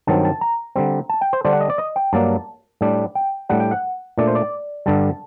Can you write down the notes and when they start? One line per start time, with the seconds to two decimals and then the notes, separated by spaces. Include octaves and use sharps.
0.07 G2 D#3 F#3 C4 A5
0.25 A5
0.41 A#5
0.76 D3 G3 C4
1.09 A5
1.21 G5
1.33 C5
1.45 D3 G3 D4 C5
1.53 F#5
1.61 D#5
1.70 D5
1.78 D#5
1.96 G5
2.13 G2 F#3 A#3 D4 A5
2.81 A2 G3 D4
3.15 G5
3.49 A2 G3 D4 F#5
3.60 G5
3.71 F#5
4.18 A#2 A3 D4 D5
4.28 C5
4.35 D5
4.86 G2 D3 G3 A5